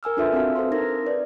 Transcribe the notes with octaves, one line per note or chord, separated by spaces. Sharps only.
A#4 G#5 E6 F6
D4 F4 A4 B4 E5 C6
C4 F#4 F5 A5
A4 C5 C6
D#4 A#4 C6 A#6
B4 D5